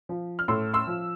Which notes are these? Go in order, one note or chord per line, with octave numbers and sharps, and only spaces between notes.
F3
F6
A2 C6 E6
C6 E6
F3